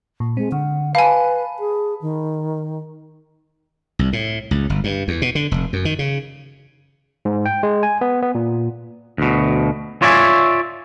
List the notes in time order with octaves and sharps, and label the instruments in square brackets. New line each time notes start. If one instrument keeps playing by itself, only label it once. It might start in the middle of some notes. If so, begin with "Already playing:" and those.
[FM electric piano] A#2
[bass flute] G#3 [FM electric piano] C4
[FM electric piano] D3 [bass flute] F#5
[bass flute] B4 [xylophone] F5 G#5 [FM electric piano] A5 B5
[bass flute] G#4
D#3
[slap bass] C2
A2
C#2
G1
G2
E2
B2
D3
F1
F#2
D#3
C#3
[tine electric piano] G#2
G5
G#3
G#5
B3
B3
A#2
[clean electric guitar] D2 B2
F4 C#5 D5 E5 G#5